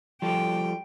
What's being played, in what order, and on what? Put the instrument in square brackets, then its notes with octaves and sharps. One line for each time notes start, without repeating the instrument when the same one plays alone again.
[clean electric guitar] F3 G3 A4 [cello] G5